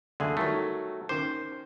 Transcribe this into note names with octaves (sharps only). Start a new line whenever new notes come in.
D2 D3 A3 G#4 C6
D#3 F#3 G3 A3
D#3 C#4 C5 D6